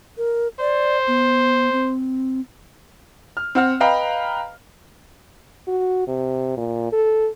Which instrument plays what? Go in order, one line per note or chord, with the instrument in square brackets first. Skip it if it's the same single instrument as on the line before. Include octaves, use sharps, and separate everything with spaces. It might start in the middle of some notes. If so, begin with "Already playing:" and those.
[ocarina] A#4
[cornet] C5 [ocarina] D5
[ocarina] B3
C4
[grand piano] F6
C4 F#5 F6
B4 D#5 F5 G5 A#5
[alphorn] F#4
C3
A#2
A4